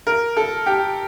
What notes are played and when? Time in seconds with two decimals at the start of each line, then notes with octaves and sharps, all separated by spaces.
0.07 A#4
0.37 A4
0.66 G4